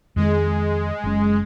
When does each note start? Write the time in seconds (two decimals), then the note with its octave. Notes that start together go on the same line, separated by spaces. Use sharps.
0.16 F2 D#3 G#3
1.04 F#1 C#4